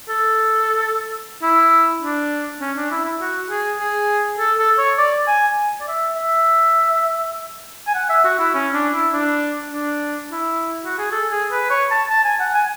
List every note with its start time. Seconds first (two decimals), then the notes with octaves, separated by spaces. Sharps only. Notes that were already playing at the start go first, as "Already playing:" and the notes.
0.09 A4
1.43 E4
2.02 D4
2.61 C#4
2.76 D4
2.91 E4
3.05 E4
3.21 F#4
3.50 G#4
3.79 G#4
4.39 A4
4.58 A4
4.78 C#5
4.98 D5
5.27 G#5
5.81 D5
5.88 E5
6.16 E5
7.87 G#5
7.95 F#5
8.10 E5
8.25 F#4
8.40 E4
8.54 C#4
8.74 D4
8.94 E4
9.13 D4
9.72 D4
10.32 E4
10.85 F#4
10.98 G#4
11.12 A4
11.31 G#4
11.52 B4
11.70 C#5
11.91 A5
12.10 A5
12.25 G#5
12.40 F#5
12.55 G#5